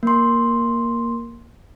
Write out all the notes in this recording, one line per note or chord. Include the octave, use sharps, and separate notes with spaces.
A#3 C6